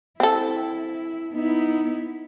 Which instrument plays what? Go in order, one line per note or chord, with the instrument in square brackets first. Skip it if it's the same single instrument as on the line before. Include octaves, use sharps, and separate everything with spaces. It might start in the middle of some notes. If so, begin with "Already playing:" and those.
[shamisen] C4 A4 [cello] E4
[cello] B3 E4 [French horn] D#4